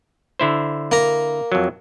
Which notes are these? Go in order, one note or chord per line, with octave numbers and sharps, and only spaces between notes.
D3 E4 C5
A#3 A#5
F2 F#3